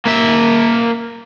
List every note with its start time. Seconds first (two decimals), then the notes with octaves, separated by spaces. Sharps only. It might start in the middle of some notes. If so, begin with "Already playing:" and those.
0.06 A#3 E5